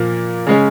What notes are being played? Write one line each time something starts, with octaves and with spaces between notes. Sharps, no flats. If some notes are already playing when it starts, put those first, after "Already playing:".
Already playing: A#2 F3 A#3
C#3 G#3 C#4